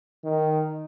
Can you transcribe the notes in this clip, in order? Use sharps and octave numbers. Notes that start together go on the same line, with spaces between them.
D#3